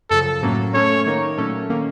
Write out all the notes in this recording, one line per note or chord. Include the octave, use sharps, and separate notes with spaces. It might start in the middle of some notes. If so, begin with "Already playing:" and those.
F#2 C#3 F3 A4
A2 F#3 A#3 C#4
A3 C#4 A4 C#5
D#3 A#3 D#4 A#4 C#5
A#2 F#3 A3 C#4 A4
D#3 A#3 C#4